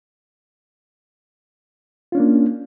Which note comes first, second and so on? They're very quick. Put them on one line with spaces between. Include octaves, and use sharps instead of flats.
F4 C#4 D4 A#3